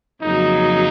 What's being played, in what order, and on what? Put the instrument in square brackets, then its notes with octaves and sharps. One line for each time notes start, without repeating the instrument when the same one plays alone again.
[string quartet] F2 C#3 F#3 A#3 [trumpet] D#4